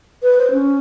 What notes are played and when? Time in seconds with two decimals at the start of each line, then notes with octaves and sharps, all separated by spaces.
0.23 B4
0.38 C5
0.51 C#4